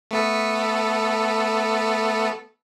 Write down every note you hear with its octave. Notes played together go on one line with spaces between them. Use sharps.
A3 B3 A4